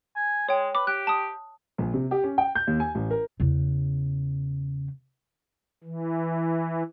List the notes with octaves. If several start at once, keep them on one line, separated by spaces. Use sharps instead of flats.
G#5
G#3 C#5 G5
B4 D6
G4 F#6
A5 D#6
A#1
C3
G4
C#4
G5
G6
D#2
G#5
A1
A#4
E2 C#3
E3